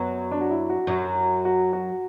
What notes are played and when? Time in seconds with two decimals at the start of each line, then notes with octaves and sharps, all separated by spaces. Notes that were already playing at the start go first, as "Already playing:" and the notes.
Already playing: F#2 F#3 B3
0.32 D4
0.41 F#4
0.50 E4
0.70 F#4
0.87 F#2 F#3
1.45 F#4
1.73 F#4